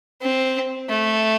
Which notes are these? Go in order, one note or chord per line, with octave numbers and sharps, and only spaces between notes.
C4
A3